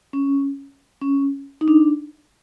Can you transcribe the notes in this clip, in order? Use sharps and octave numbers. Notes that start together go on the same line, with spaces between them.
C#4
C#4
D#4
D4